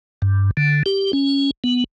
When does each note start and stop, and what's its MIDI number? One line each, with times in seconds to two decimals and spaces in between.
0.22 0.51 43
0.57 0.83 50
0.86 1.12 67
1.13 1.51 61
1.64 1.84 59